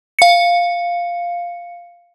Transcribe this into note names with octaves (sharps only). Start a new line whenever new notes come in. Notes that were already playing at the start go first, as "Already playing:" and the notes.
F5 C#7